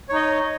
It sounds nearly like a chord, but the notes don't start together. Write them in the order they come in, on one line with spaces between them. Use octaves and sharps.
C#5 D#4 D#5